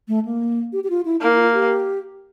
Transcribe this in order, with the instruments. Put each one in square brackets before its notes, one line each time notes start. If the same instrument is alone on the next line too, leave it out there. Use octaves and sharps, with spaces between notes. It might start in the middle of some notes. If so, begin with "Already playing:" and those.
[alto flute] A3
A#3
G4
G4
F4
E4
[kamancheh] A#3 [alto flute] E4
[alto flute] E4
F4
G4